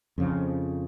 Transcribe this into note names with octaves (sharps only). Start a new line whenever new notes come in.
F2 C#3 F3